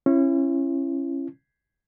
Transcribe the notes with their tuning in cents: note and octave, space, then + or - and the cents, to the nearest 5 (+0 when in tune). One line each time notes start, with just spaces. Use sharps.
C#4 -25 E4 +30